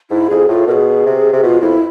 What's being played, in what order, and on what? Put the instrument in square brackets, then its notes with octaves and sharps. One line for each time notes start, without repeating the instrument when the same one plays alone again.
[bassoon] G#2 [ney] E4
[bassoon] F2 [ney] G#4
[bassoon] A2 [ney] F4
[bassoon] B2 [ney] A#4
[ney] G#4
[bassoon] C3
C3
[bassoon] B2 [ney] F4
[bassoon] F2 [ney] E4